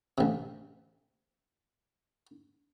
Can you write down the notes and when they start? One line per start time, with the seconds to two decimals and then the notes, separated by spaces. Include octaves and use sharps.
0.18 A1 C3